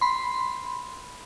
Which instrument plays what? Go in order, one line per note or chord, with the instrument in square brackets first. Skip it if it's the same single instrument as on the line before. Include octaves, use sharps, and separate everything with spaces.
[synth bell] B5 C6